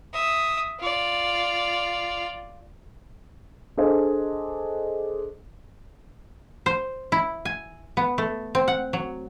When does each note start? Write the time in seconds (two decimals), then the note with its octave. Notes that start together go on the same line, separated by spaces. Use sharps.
0.13 E5 D#6
0.80 F4 D5
3.77 D4 G#4 A4 C5 D#5
6.66 C5
7.12 E4
7.45 G#5
7.97 B3
8.18 A3
8.55 C4
8.68 F#5
8.93 F#3